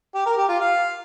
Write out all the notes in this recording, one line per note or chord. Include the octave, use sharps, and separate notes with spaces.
G4
A#4
G4
F4
F5